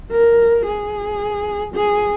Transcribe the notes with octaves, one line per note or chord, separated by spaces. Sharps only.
A#4
G#4
G#4